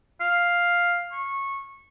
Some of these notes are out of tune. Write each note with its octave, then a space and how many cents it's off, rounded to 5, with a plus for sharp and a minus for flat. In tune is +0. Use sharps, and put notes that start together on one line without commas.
F5 +5
C#6 -20